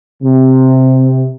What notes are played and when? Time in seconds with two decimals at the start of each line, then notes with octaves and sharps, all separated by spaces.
0.22 C3